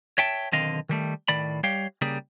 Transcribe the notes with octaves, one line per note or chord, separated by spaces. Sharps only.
C#5 E5 G5 A5
B1 D3 D#3 C4 D#5 F5
D#3 G3 A3
A2 D#3 D5 B5
G3 G4 C#5 F5 G5
C#3 G3 A#3 G#4